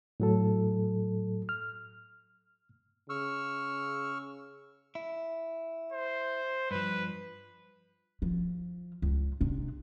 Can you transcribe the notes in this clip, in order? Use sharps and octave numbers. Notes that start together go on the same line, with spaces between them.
A2 F#3 A4
F6
C#3 C#6 E6 F6
E4
C5
G2 F3 B4
F3
C#2
C3 D4